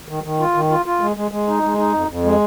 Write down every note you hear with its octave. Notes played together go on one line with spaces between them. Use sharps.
D#3
D#3
F4
D#3
F4
F4
G#3
G#3
G#3
D#4
G#3
D#4
F2
F2
G#3